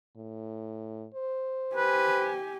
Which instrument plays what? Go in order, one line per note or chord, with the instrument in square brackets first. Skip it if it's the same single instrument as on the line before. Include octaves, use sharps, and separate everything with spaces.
[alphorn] A2
C5
[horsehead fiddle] G4 G#5 [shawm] B4